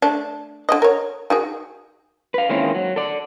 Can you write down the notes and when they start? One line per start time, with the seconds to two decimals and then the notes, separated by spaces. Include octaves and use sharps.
0.02 A3 D4
0.69 D3 D#3 D#5
0.82 A#4 C#5
1.30 D#3 F#4 G#4
2.34 B4 F5
2.49 D#3 G#3 A#3 C4 C#4 E4
2.75 F#3
2.96 A4 D5